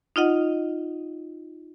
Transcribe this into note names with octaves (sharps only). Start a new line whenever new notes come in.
D#4 F4 D#5 F#5